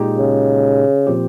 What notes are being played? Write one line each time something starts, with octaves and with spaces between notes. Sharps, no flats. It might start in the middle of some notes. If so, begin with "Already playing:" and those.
Already playing: A#2 G#3 D#4 G4
C#3
A#2 F3 C4 G4